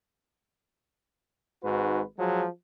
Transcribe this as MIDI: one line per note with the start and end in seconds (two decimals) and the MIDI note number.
1.64 2.02 32
1.64 2.02 44
1.64 2.02 66
1.64 2.02 71
2.19 2.46 53
2.19 2.46 54
2.19 2.46 56